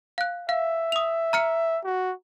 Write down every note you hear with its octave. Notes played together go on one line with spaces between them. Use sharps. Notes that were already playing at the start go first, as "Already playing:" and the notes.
F5 F#6
E5 F5
D#6 F7
A#5 F6 C#7
F#4